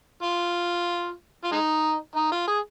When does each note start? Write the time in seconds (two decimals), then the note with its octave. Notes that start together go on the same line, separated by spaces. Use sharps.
0.23 F4
1.44 F4
1.52 G#3 D#4
2.16 D#4
2.32 F4
2.48 G#4